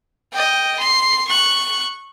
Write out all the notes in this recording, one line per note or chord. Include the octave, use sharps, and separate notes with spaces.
D#5 G5
C6
C#6 F#6